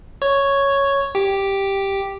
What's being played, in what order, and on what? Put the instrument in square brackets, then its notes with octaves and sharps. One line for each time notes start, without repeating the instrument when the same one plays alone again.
[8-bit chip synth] C#5
G4